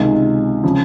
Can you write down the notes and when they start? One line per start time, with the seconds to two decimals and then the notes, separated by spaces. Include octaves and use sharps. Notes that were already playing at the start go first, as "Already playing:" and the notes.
Already playing: C#2 C3 D#3 G#3
0.63 C#3 F3